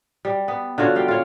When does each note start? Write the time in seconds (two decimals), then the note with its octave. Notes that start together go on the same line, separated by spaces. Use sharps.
0.25 G3
0.48 B3
0.78 D3 F4 F#4 C#5
0.95 G3 F5 G5
1.08 F4 C#5